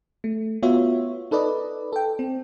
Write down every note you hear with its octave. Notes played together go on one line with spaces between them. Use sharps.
A3
B3 F4 F#4 C#5 E5
D#4 A4 B4 D5 D#5
A4 G5
C4